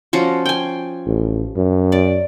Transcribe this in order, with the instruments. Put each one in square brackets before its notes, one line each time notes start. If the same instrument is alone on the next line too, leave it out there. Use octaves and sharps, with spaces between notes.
[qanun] F3 C#4 F#4
G5 G#5
[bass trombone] A1
F#2
[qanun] D5